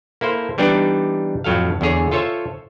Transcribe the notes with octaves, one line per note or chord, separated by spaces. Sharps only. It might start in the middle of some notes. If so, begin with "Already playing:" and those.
A#3 E4 A4 C5
E3 G3 B3 D4 D#4
F2 A2 F#3 A4 F5
E2 D3 G#4 C#5
F4 A4 C5 C#5 E5